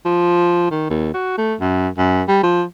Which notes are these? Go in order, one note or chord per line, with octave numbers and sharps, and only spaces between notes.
F3
D#3
D#2
F#4
A3
F#2
F#2
G3
F3